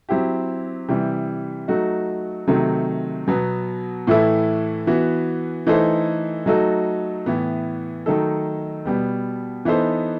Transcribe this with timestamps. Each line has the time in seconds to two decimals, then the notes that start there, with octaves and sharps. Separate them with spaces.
0.09 F#3 C4 E4 G4
0.89 C3 E3 G3
1.68 F#3 A3 D#4 F#4
2.48 C3 D#3 F#3 A3
3.28 B2 F#3 B3
4.07 A2 E3 A3 E4 A4
4.87 E3 B3 F#4
5.67 E3 A3 D#4 A4 C5
6.46 F#3 A3 D#4 F#4 A4
7.26 A2 E3 B3
8.06 D#3 F#3 A3 D#4 A4
8.85 B2 G3 B3
9.65 E3 B3 D#4 A4 C5